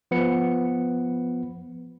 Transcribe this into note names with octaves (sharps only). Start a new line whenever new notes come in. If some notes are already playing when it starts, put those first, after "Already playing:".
F3 B3 B4 C#7